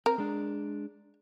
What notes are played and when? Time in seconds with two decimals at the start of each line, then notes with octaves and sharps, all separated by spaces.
0.06 C4 A#4
0.18 G#3 D4